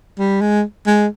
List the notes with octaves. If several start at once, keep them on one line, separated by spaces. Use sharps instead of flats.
G3
G#3
G#3